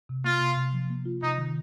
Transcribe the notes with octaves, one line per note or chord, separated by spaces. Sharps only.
C3
A#3 F4
C3
C3
F3
A#3
F4
C3 D#4
D#3